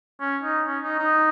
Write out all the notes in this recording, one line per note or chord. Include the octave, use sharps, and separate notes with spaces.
C#4
D#4
C#4
D#4
D#4